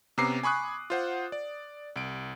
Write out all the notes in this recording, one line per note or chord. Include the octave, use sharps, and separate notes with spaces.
C3 B3 C#4 A#5 D6 C7
G#5 B5 C#6 D#6 F#6
F4 C5 F#5
D5
C2 D7